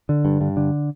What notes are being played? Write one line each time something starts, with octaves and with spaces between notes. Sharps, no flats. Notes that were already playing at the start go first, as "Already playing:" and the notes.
D3
G2
G2
D3